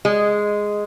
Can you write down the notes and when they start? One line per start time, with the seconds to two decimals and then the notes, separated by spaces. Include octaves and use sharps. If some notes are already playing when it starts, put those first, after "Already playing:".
0.05 G#3